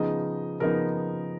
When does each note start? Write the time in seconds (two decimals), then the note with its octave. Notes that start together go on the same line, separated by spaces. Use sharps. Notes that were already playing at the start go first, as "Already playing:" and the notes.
Already playing: C#3 F3 B3 D#4 D#5
0.60 C#3 F3 B3 D#4 A#4